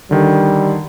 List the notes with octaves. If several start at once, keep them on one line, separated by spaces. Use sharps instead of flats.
D3 D#3 G3